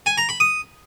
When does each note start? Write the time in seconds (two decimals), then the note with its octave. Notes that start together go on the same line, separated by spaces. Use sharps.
0.06 G#5
0.18 A#5
0.29 B5
0.40 D#6